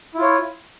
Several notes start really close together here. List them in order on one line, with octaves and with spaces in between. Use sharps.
E4 F4 C#5